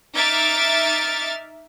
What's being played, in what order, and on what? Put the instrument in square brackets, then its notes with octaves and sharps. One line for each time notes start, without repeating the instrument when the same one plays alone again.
[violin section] D#4 E5 D6 F6 A6 D7